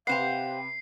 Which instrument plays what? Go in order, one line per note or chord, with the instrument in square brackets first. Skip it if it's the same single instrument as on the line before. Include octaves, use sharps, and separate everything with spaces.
[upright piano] C3 B4 [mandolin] G4 C5 F#5 [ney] F5 [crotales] C7